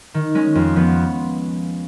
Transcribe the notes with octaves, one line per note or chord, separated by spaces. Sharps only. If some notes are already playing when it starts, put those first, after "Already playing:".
D#3
G#3 C#4
F2
F3 B3